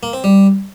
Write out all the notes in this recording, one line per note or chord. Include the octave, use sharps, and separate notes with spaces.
A#3
C4
G3